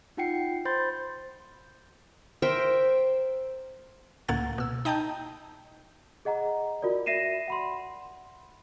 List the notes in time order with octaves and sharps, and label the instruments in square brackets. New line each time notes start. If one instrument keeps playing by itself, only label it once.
[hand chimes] D#4 F4 F#5 G5 C7 C#7
C5 B5 C6 G6 A6
[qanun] A#4 C5 E5 G5
[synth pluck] C#2 A2 A#3 F#5 G#6 A6
B2 E6
D#4 D#5 G5 A5 A#5 G6
[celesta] G#4 D#5 F#5 A#5
F4 F#4 A#4 D5
D5 E5 A#6 C7 D#7 E7
F#5 B5 C6